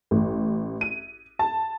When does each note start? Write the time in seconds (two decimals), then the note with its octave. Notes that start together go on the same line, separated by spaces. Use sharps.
0.11 A1
0.81 D#7
1.39 A5